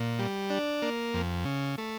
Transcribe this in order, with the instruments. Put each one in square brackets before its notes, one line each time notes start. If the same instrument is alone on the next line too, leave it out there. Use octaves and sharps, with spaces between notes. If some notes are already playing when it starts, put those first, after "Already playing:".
Already playing: [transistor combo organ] A#2
G3
D4
A#3
F2
C#3
A3